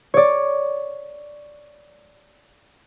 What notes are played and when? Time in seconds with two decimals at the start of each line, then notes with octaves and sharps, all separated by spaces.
0.14 C#5 D5